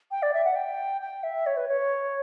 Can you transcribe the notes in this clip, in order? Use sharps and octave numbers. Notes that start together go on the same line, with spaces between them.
G5
D5
E5
F#5
G5
G5
E5
C#5
B4
C#5